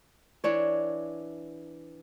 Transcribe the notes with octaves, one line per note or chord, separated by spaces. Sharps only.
E3 D4 C#5